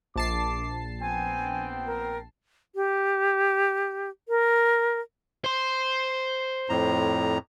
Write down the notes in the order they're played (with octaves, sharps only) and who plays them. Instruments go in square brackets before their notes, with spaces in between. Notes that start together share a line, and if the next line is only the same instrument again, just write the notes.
[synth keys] A#1 A5 C7 [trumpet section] D6
[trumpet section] B3 C4 G5 [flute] G#5
[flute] A#4
G4
A#4
[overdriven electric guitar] C5 C6
[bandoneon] F2 A2 A#5